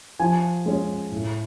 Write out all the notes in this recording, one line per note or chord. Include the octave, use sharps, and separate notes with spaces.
F3 G#5
G#3 C#4
A2